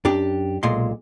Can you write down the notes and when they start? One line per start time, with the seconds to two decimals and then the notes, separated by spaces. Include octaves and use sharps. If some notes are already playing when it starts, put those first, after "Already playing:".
0.05 F#2 D4 G4
0.63 B1 A#2 G#3 C6